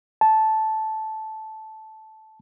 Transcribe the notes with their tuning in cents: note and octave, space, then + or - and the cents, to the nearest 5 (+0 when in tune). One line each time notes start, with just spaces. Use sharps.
A5 -10